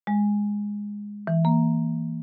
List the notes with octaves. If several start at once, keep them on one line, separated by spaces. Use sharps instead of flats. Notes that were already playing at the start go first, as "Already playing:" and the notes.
G#3
E3
A#3